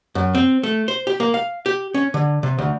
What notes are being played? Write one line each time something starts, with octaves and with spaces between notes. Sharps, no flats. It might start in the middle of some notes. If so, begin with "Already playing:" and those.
F#2
C4
A3
C5
G4
A#3
F5
G4
C#4
D3
C3
D2